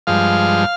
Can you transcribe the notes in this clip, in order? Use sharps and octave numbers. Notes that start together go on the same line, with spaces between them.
G2 F3 G#3 F5